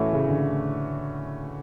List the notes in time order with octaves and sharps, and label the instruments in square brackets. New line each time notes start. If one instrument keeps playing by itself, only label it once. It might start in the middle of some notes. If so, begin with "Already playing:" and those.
Already playing: [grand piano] A2 [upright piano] E3 A3 C#4 F#4
[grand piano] C#3
D3